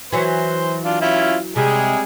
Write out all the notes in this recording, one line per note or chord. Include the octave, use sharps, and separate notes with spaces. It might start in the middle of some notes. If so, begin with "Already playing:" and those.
E3 F#3 C5
D4 F4
C#4 E4 F4
C3 G3 G#3 G#4